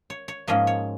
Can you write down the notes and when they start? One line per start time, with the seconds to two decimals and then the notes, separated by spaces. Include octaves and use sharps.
0.10 C#5
0.28 C#5
0.47 G#2 F3 A#3 C#4 D#5
0.67 C#5